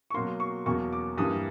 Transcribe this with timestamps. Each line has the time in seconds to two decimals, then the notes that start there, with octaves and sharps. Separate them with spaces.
0.10 C#6
0.14 B2 F#3 A#3 C6
0.40 C#6
0.66 E2 B2 F#3 A#3 C#6
0.93 D6
1.18 G2 E3 G3 A#3 D#6